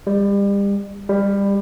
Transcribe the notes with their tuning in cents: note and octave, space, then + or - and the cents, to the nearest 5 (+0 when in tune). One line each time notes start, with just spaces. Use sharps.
G3 +35
G3 +25